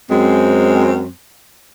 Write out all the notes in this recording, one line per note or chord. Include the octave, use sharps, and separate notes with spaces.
F#2 G#3 C4